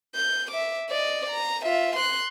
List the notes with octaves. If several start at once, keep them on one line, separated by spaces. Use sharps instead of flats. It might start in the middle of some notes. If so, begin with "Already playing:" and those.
G6
E5 D6
D5 D#5
A#5
F4 E5
C6 F#6